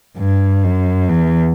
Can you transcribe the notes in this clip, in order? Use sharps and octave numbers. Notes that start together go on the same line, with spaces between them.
G2
F#2
E2